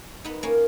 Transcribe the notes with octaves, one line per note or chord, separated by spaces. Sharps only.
B3 D#4
A#3 C#4